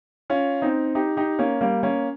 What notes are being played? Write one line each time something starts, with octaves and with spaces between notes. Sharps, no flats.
C#4 F4
C4 D#4
D#4 G4
D#4 G4
A#3 C#4
G3 A#3
A#3 C#4